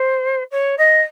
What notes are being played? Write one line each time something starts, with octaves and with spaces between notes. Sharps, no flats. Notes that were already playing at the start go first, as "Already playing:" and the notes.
Already playing: C5
C#5
D#5